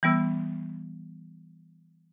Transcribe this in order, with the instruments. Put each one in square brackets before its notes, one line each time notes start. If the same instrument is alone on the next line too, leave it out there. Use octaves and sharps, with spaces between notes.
[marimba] E3 G3 B3 E6